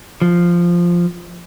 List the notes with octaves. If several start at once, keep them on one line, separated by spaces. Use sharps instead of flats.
F3